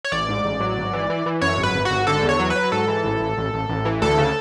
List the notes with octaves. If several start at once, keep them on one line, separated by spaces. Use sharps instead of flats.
C#5
A1 D5
G#2
A1
F#3
G#1
E3
E3
E3
F#2 C#5
G#1
B4
G#1
F#4
G#1
D3 A4
E2
C#5
F#3
B4
F#3
G#2 A4
E3
A1
A1
A1
A1
A1
E3
D2 A4
C#3